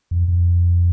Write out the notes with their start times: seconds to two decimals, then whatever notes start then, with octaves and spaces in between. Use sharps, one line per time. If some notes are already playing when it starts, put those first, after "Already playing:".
0.11 F2
0.28 F2